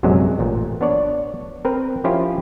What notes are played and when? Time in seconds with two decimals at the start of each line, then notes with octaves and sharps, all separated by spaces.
0.03 A#1 F#2 C3 F#3 G#3 F#4
0.39 A1 A#2
0.81 B3 D4 C#5 D5
1.65 C4 A#4 B4
2.04 F3 C#4 E4 F4 G4